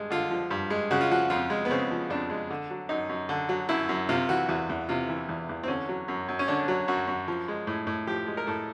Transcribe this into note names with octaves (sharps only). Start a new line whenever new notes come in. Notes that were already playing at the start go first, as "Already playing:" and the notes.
Already playing: G2 G#3
D3 F4
F3
G2
G#3
C#3 F#4
F4
F3 F#4
F2 F4
G#3
B3
C#3 C4
F3
F2 D4
G#3
D3
F#3
F#2 D#4
F#2
D3
F#3
F#2 E4
F#2
C3 F4
E3 F#4
E2 F#4
E2
C3 F4
E3
E2
E2
C4
D3 C#4
F#3
F#2
F#2
C#4
D3 D4
F#3
F#2 F#4
F#2
F3
G#3
A2
A2
F3 G4
G#3
A#4
A2 A4